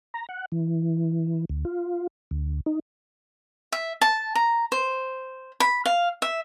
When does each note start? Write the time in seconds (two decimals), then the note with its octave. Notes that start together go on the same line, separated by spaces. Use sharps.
0.14 A#5
0.29 F#5
0.52 E3
1.49 D2
1.65 F4
2.31 D2
2.66 D#4
3.72 E5
4.01 A5
4.35 A#5
4.72 C5
5.60 B5
5.86 F5
6.22 E5